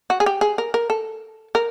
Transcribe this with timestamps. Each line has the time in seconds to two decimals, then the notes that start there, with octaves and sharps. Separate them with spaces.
0.10 F#4
0.20 G#4
0.26 G4
0.41 G#4
0.58 A#4
0.74 A#4
0.90 A4
1.55 A#4